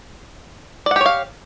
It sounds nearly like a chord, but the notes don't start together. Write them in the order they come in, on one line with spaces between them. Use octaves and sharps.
D5 F#5 G4 C#5 F5